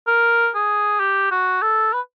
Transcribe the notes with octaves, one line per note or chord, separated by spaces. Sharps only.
A#4
G#4
G4
F#4
A4
B4